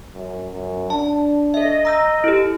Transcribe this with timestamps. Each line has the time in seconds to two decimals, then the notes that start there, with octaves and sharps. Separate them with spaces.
0.13 F#2
0.53 F#2
0.90 D4 A5
1.54 A4 D#5 E5
1.85 A#5 E6 G6
2.24 E4 G4 A4